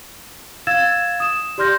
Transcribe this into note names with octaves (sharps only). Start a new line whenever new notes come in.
F5 E6 G#6 A6 E7
D#6 E7
G4 D5 C6 F6 G6 A#6